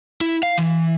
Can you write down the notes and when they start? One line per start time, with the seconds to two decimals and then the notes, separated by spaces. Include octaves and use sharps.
0.21 E4
0.43 F5
0.58 E3